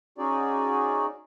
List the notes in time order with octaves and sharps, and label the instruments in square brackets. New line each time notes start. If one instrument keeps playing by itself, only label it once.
[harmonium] C#4 D#4 F#4 G#4 D5